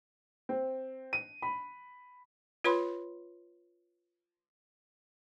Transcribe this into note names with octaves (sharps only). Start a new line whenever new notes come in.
C4
D#7
B5
F4 B4 C#5 B5 C6